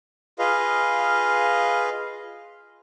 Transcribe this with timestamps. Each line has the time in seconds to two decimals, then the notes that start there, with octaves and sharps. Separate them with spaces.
0.39 F4 G#4 B4 D#5 F5